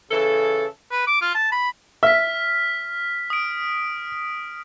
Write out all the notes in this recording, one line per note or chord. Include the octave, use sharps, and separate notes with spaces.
C#3 E3 A4
B4
D6
F4
A5
B5
E5 F6 B6
D#6 D7